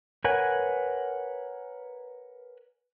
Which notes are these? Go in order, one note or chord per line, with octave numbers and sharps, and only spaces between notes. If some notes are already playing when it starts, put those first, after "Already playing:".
A#4 B4 C#5 F#5 G#5